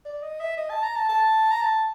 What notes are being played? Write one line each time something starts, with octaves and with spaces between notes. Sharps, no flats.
D5
D#5
E5
D#5
A5
A#5
A5
A5
A#5
A5